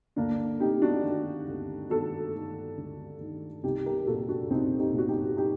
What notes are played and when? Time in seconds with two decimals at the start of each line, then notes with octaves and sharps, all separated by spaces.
0.16 D2 A#3 D4
0.60 C3 D#4 G4
0.82 D4 F#4
1.04 D#3
1.48 D2
1.90 D#3 F#4 A4
2.34 D#3
2.78 D2
3.21 D#3
3.63 C2 D#4 G4
3.86 G4 A#4
4.07 A#2 F#4 A4
4.29 D4 F#4
4.50 C2 C4 D#4
4.79 D#4 G4
4.93 A#2 F#4
5.08 D#4 G4
5.37 D#4 G4